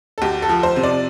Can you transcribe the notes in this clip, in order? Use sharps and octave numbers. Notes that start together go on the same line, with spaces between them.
A4
D2 G4
A4
F3
C5
C3
D5